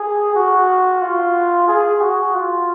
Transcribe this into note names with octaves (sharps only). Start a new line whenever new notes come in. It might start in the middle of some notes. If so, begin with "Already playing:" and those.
Already playing: G#4
F#4
F4
G#4
F#4
F4